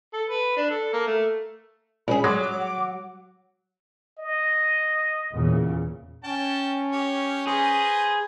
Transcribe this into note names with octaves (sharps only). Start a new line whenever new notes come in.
A4
B4
D4
A4
A#3
A3
A#1 C#4 G#4 B5
F#3 G#3 C#5 D6
F#5
D#5
E2 A#2 C#3
C#4 G5 A5
G4 C#5
G#4 B4 C5 D#5